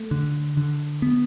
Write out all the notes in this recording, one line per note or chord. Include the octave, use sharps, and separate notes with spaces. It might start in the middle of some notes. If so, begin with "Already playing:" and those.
Already playing: A3
D3
D3
B3